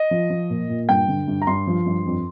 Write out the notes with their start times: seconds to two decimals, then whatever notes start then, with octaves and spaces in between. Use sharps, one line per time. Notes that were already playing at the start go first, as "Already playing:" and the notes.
Already playing: D#5
0.11 F3
0.30 F3
0.50 A#2
0.69 A#2
0.89 G2 G5
1.08 D3
1.28 G2
1.42 A#5
1.47 G2 C6
1.67 F3
1.86 G2
2.06 F2